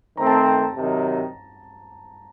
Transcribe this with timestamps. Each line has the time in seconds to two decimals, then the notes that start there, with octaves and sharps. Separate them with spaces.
0.17 D#3 A3 C4 A#5
0.27 A5
0.46 A5
0.75 C3 D#3 F#3